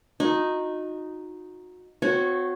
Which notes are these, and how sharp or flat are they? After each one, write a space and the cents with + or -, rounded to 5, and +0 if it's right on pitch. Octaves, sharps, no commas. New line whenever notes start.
D#4 +0 F#4 -30
C4 -35 F#4 -20 C#5 +0